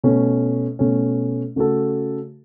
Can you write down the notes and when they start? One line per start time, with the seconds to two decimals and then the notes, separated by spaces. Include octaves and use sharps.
0.03 B2 A3 C#4
0.79 B2 A3 C#4
1.56 C#3 A3 F#4 A4